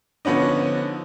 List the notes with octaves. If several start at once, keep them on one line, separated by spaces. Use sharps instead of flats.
D3 F3 B3 C#4 D#4